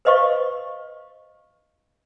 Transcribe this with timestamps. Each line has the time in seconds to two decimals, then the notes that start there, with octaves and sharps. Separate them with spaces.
0.05 B4 C5 D#5 F5 C#6